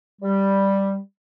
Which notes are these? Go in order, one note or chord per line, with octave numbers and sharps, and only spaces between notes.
G3